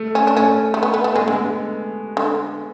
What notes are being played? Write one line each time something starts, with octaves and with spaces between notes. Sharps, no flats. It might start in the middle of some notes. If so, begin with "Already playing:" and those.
Already playing: A3
C#4
D4
A3 C#4
A3
B3
B3
A3
B3
G#3 A3
D3 G#3
D3